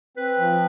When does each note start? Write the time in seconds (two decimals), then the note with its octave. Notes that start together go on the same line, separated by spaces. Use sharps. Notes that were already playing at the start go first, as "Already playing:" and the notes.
0.17 C4 B4
0.38 F3